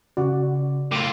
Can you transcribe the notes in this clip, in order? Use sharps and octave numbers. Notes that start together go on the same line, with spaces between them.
C#3 F#4 D5 F#5
A2 F4 D6